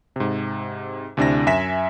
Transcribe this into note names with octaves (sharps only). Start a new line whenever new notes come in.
G#2 C3
D2 C3 D4 E4 A#6
F#2 E5 G#5 A#6 B6 E7